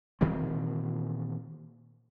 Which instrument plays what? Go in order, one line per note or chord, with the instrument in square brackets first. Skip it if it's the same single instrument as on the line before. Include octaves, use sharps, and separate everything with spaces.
[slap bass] A#2 D#3 E3 C4